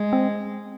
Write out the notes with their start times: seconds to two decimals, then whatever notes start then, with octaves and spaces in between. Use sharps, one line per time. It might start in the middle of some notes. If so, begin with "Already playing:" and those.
Already playing: G#3
0.13 C4